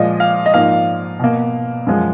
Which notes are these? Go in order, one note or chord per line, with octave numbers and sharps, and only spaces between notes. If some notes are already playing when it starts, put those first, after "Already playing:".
Already playing: A#2 F3 G#3 D#5
F5
D#5
G#2 F3 A#3 F5
B2 A#3
F#2 F3 G#3